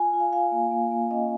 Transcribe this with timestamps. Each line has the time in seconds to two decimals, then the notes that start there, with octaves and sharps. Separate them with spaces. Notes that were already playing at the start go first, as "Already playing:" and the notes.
Already playing: F4 G#5
0.14 F4
0.20 F5
0.32 F4 F5
0.52 A#3
0.71 A#3
0.91 A#3
1.11 C#4 D#5